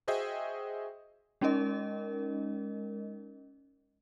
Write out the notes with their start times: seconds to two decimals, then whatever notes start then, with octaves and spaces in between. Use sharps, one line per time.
0.08 F#4 G#4 C5 D#5 E5 G5
1.41 G#3 C#4 D#4 A#4 D#5